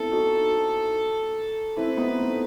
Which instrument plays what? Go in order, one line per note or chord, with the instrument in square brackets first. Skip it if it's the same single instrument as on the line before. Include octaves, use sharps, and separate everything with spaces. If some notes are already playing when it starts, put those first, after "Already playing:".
Already playing: [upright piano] B3 C4 E4 [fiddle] A4
[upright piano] D#4 F#4
[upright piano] C4 E4 [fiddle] B4
[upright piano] B3 D#4
A3 C4